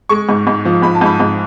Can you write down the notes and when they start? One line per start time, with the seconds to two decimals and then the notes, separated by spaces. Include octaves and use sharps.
0.09 G#3 C#6
0.29 G#2
0.47 G#2
0.65 F3
0.82 G#2 B5
0.95 A5
1.01 G#2 B5
1.20 G#2